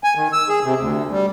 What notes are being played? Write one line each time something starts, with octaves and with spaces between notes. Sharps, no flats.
G#5
D#3
E6
G#4
C3
D2
G3